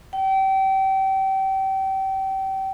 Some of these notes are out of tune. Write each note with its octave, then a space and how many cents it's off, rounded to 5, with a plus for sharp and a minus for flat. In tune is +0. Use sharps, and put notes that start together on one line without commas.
G5 -30